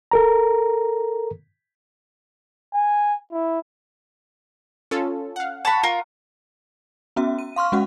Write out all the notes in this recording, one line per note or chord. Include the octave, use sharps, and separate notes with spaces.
A4 A#4 A#5
G#5
E4
C#4 F4 A4
F5 F#5
F#5 A5 B5 C#6
F4 A#4
B3 C#4 F#4 E5
D#7
F5 C6 C#6 F6
G#3 C#4 F#4 F#5